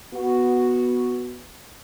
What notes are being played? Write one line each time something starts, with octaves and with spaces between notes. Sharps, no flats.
B3 F#4